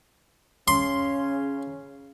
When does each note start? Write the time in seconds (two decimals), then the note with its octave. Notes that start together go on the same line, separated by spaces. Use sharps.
0.68 C#3 C#4 C6